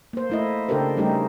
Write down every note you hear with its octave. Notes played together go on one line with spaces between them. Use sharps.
A#3 C5
A3 E4 D#5
C#3 D4 G4 A4 A#4 C5
G3 A3 C#4 D#4 G4